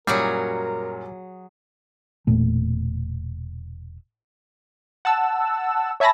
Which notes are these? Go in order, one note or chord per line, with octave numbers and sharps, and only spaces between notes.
F#2 A#2 F#3 G3 F#4 G#4 A#4 D#6
E1 A#2 A3
F#5 A5 E6
C#5 E5 G#5 A5 B5 A#6